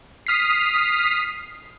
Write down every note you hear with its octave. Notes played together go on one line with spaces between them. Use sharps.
D#6 F6 B6 C7